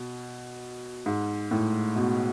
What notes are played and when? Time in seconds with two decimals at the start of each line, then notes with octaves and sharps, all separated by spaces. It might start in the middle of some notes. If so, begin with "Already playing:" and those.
Already playing: B2
1.06 G#2
1.51 A2
1.96 B2